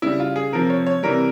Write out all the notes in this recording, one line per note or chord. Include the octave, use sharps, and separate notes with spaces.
C#3 G3 E4
F4
G#4
C3 F3 A#4
C#5
C#5
C3 E3 G3 A#4